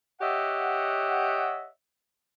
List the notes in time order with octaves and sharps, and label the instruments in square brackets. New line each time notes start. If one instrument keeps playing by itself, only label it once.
[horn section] G4 C#5 D#5 E5 F#5